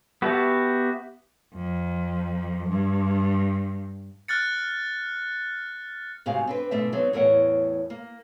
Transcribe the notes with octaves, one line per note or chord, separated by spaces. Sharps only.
B3 F#4 G4 E5 A5
F2
G2
F6 F#6 A6 C#7
G#2 C3 F#4 F5 G#5
C4 D4 B4
G#2 B2 A3 D4 E5
F#3 B3 C4 D#4
E2 A2 A#4 C#5 F#5
A#3